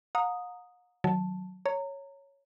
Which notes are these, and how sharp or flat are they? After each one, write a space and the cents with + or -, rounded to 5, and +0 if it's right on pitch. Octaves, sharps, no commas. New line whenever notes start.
F#5 -45 A#5 -5 D#6 +0
D#3 +0 F#3 +0 A5 +0
C#5 +0 A#5 -25